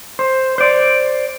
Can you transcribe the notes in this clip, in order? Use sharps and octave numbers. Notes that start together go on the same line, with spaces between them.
C5
C5 D5